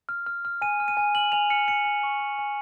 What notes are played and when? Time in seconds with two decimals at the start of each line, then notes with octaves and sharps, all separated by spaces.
0.09 F6
0.27 F6
0.45 F6
0.62 G#5 D#7
0.80 F6
0.88 D#7
0.97 G#5
1.15 F6 F#7
1.32 G#5 F7
1.50 F6 C#7
1.68 G#5 C#7
1.85 G#5
2.03 C#6
2.20 G#5
2.39 G#5